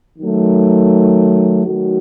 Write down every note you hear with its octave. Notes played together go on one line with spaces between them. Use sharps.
D#3 F#3 A3
D#3 F#3 A3 D#4 F#4